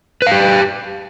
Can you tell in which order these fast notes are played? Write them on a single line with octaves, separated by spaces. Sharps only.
B4 F5 G4